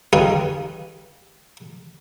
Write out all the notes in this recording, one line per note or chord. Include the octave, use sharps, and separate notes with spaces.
D#4 G4 G#4 B4 C#5 F5